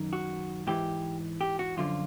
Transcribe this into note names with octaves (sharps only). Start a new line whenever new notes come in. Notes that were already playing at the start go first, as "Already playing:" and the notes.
Already playing: F#2 D#3
F#4
G#2 E3 G4
G4
F#4
F#2 D3 F3 F4